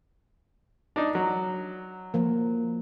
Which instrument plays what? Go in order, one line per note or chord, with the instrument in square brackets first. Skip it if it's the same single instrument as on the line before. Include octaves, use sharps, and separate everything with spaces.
[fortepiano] D4 D#4
F#3
[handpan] F3 A#3